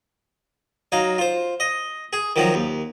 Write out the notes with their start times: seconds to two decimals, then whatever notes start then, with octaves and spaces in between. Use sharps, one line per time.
0.92 F#3 D#4 F5
1.18 F4 C5
1.60 D#5
2.13 G#4
2.36 D#3 F3 F#3
2.54 D#2